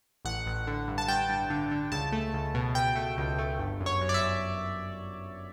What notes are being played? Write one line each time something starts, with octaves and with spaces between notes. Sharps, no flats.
A1 F#5
A1
D3
G2
A5
G2 G5
G2
D3
D3
C#2 A5
A3
C#2
B2
B2 G5
A3
C#2
A3
G1
F#2
C#5
F#2
D5
E5